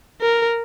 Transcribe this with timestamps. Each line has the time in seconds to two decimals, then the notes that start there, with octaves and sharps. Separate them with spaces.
0.21 A#4